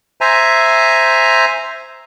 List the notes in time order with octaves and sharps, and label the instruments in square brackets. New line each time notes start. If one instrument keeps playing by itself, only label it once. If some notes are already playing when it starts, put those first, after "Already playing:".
[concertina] C5 E5 G#5 A#5